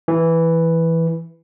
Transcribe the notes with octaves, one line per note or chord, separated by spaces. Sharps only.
E3